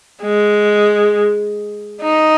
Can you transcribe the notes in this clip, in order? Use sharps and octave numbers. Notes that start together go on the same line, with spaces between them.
G#3
D#4